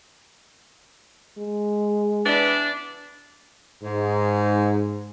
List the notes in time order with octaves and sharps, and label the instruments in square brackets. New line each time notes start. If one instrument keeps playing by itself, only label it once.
[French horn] G#3
[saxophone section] E3 B3 D4
[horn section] G#2